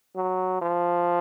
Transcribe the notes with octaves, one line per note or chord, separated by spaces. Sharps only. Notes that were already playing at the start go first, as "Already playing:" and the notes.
F#3
F3